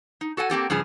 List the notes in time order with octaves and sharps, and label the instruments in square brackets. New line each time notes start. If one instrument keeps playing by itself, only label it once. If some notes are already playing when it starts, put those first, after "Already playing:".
[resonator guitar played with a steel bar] D#4
F#4 A4 F#5 G#5
A#3 C4 G4 A4
G2 C#3 F3 G#4